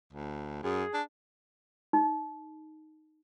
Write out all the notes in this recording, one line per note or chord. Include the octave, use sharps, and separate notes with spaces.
D2
F#2 G#4
D4
D#4